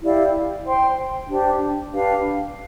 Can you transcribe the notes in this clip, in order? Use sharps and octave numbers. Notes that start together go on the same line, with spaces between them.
E4 G4 D5 F5
C5 G5 C6
D4 G4 C5
D4 G4 B4 F5